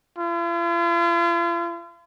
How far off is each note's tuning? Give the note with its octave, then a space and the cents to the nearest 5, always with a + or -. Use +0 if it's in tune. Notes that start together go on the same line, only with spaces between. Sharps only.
F4 -45